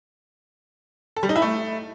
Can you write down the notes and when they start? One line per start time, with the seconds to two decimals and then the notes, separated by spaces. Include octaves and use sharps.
1.17 A4
1.23 G3
1.29 D#4
1.36 E4
1.42 A3